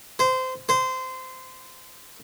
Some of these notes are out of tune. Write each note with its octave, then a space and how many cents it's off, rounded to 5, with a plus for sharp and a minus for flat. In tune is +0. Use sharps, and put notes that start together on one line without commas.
C5 -20
C5 -20